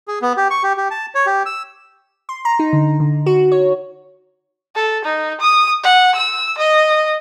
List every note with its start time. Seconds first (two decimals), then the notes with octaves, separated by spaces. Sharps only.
0.08 G#4
0.22 B3
0.37 G4
0.51 C#6
0.63 G4
0.77 G4
0.91 A5
1.15 C#5
1.26 G4
1.46 E6
2.29 C6
2.45 A#5
2.59 D#4
2.73 D3
3.00 D3
3.26 F#4
3.52 C#5
4.75 A4
5.05 D#4
5.41 D#6
5.83 F#5
6.15 E6
6.58 D#5